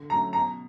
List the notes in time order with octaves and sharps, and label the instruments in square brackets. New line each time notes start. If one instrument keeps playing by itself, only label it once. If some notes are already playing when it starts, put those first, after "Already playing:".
Already playing: [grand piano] D3
[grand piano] F#3 A3 C#4 [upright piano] A#5
[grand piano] B2 [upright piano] A#5